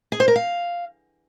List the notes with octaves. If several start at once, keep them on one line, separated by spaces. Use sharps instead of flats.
G#4
C5
A#4
F5